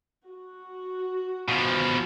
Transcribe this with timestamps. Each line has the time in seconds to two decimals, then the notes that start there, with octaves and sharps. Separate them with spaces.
0.28 F#4
1.49 B2 F3